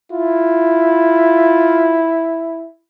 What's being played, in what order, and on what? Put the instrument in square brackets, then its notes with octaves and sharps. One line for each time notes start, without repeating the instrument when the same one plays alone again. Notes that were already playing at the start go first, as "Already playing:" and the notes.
[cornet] E4 [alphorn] F4